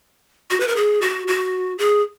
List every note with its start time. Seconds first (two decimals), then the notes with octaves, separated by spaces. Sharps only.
0.50 F#4
0.60 B4
0.68 A#4
0.76 G#4
1.02 F#4
1.28 F#4
1.78 G#4